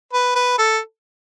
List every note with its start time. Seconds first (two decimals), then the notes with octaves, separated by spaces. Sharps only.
0.13 B4
0.35 B4
0.58 A4